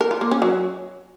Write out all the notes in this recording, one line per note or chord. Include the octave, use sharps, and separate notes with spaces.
A#4
F4
A#3
C#4
F#3